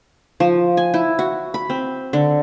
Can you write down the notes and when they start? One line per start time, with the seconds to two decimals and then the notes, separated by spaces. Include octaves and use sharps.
0.40 F3
0.77 G#5
0.94 E4
1.19 F#4
1.54 B5
1.70 C4
2.13 D3